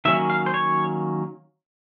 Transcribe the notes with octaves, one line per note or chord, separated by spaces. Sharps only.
D#3 F#3 A#3 C#4 E5
F5
C5
C#5